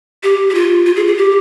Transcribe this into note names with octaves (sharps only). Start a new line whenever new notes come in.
G4
G4
F4
F4
G#4
G#4
G4